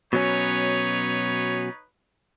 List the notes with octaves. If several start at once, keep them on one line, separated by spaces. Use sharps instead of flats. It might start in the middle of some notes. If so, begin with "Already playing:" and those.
B2 F#3 C#4 D#4 B4 C#5